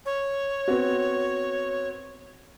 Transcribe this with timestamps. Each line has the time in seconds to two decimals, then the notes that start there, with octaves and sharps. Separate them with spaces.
0.06 C#5
0.68 B3 C4 F#4